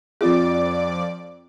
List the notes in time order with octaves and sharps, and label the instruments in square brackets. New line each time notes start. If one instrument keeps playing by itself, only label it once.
[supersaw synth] F2 D5 D6 [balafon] C4 F4 G#4